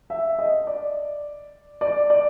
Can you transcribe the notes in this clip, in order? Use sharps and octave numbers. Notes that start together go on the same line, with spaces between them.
E5
D#5
D5
D5
D5